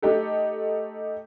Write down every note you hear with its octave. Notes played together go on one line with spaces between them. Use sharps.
A3 D#4 G4 A4